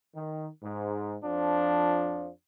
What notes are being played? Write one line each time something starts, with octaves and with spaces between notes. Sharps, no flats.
D#3
G#2
F2 F3 D4